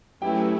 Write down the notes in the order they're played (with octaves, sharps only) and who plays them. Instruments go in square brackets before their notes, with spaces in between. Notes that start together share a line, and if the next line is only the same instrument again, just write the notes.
[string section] F#3 A3 C#4 E4 B4 [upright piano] G4 G5